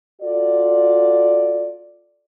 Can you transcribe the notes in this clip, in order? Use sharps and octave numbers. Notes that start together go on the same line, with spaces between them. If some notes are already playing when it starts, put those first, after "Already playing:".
F4 F#4 A4 D5